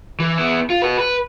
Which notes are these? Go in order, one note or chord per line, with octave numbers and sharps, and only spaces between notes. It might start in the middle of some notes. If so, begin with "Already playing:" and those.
E3
B3 E4
F4
F#4 B4
B4